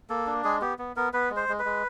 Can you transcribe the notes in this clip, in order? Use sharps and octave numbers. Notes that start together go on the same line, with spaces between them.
A#3 A4
D4
G#3 G#4
B3 G4
B3
B3 A#4
B3 B4
G#3
C5
G#3
B4
G#3